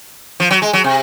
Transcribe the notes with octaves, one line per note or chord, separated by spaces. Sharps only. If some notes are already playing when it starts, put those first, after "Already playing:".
F3
F#3
G#3
F#3
C3